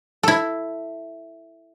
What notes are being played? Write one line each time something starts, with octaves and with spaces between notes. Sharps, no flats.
E4 A4